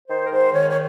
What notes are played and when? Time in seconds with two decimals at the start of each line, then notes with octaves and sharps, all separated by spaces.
0.09 D#3 C5
0.26 A#4
0.30 G#2 C5
0.53 D#3 C#5
0.70 C#5